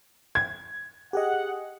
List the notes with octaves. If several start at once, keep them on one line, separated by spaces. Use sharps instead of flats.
G#6
G4 G#4 D#5 F#5